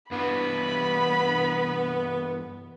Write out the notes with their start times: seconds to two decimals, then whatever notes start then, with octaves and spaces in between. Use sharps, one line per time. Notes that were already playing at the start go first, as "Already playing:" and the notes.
0.11 G2 E3 B3 B5